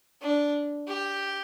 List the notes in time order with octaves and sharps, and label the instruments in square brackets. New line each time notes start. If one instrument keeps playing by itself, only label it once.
[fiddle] D4
G4